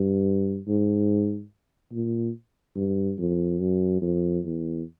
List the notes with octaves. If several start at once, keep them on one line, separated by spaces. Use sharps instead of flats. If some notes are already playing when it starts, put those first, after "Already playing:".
Already playing: G2
G#2
A#2
G2
F2
F#2
F2
E2